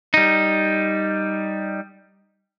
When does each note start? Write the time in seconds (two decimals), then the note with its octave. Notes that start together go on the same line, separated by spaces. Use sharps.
0.14 G3 D#4